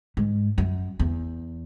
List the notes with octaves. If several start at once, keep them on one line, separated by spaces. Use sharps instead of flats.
G#2
F#2
E2